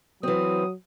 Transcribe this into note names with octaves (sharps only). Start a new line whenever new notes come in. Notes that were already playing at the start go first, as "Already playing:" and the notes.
E3 F#3 C4 D#6